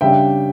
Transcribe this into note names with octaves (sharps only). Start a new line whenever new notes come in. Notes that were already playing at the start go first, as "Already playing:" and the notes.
C#3 G3 D4 E5 G5